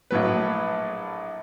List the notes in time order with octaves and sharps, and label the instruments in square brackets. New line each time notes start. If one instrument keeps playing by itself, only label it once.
[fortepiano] A#1 A2 F#3 B4